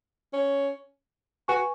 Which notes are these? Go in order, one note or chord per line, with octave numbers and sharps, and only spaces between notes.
C#4
F#4 B4 G#5 C#6